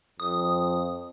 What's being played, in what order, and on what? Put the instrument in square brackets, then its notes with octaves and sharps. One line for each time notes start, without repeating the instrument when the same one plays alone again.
[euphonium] F2 [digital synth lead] D#6